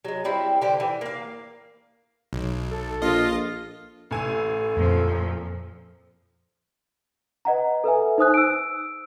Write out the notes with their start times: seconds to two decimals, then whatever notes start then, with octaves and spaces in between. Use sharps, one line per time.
0.05 F#3 G#3
0.24 G3 C4 E4
0.62 D3 G4 C5
0.80 E3
1.01 A#3 F5
2.33 B1
2.70 A4
3.02 A#1 F4 D#5
4.11 A1 A4 G#5 E6
4.76 F2 A#2 F3 C4
7.45 B4 D#5 F#5 A#5
7.84 A4 B4 E5 G#5
8.18 D#4 C5 D#6 F#6
8.34 E6 D7